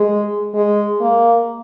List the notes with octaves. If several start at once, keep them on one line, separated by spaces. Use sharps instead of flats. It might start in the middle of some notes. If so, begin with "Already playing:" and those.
Already playing: G#3
G#3
A#3